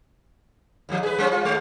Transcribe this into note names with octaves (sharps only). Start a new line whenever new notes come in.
D#2 G#2 F3
G#4 B4
G3 C4 C#4
F4
D#2 G#3